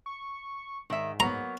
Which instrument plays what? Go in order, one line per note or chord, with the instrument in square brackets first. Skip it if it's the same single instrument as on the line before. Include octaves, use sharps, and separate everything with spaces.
[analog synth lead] C#6
[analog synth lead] G#2 [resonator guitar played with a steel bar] D#3 E5
[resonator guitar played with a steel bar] F#3 A#3 B3 [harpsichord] A#5